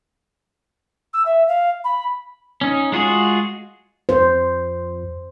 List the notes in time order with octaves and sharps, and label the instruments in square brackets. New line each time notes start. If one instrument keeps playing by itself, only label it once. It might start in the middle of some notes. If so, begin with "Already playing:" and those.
[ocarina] E6
E5
F5
B5
[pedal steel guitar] C#4 D#4
G#3 F4 F#4 G#4
[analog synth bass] F2 [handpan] C5